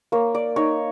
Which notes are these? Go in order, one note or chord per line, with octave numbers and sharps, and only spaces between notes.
A#3 C#5
D5
D#4 C#5